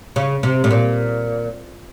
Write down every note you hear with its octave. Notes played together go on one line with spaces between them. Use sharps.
C#3
C3
A2
A#2